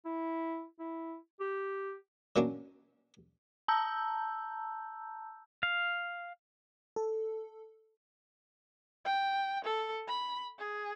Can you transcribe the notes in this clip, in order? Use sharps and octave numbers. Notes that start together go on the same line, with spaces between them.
E4
E4
G4
F#3 A#3 C#4 D4
A5 A#5 E6 G6
F5
A4
G5
A4
B5
G#4